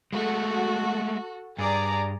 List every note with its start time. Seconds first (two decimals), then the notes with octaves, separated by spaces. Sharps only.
0.13 G#3 A3 F#4 A4
1.59 G2 G#4 D5 A#5